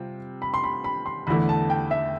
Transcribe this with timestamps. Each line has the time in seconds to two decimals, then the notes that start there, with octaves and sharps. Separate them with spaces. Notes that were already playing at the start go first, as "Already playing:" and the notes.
Already playing: C3 G3 C4 F4
0.42 B5
0.54 C6
0.64 B5
0.84 B5
1.06 C6
1.27 E2 D3 A3 E4 B5
1.49 A5
1.70 G5
1.91 E5